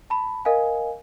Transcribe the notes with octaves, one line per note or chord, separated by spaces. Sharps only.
A5 B5
A#4 D#5 F5 G#5